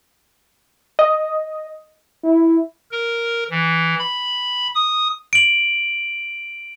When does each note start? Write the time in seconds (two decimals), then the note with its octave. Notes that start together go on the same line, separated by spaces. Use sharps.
0.99 D#5
2.24 E4
2.91 A#4
3.51 E3
3.99 B5
4.75 D#6
5.33 D7 F#7